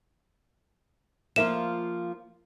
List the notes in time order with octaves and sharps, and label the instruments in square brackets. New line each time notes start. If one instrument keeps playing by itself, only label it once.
[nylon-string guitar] F3 A#3 F4 [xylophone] E5 E7